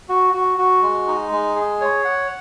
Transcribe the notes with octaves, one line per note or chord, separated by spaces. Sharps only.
F#4
F#4
F#4
G#3
D#4
G#3
G#4
C#5
F#5